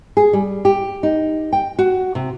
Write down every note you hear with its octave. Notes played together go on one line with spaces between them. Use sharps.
G#4
G3
G4
D#4
G5
F#4
C3